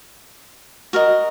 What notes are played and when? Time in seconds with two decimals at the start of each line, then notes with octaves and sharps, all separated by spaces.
0.93 F#4 A#4 D#5